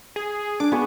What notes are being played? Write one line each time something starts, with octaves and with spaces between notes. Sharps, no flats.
G#4
D4 D6
B3 G#4 C#6 D6